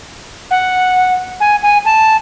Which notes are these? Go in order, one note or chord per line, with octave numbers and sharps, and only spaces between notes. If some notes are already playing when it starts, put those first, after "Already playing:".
F#5
G#5
G#5
A5